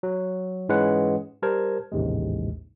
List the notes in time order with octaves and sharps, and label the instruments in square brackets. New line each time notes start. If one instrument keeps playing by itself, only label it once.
[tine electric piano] F#3
G#2 E3 G#3 C#4 B4 F#5
G3 G4 A#4 C5 A5 G#6
A1 D#2 G#2 C3 G#3